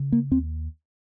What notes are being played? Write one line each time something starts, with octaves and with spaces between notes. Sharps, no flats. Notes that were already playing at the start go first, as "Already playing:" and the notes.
Already playing: C#3
A#3
D#2 C4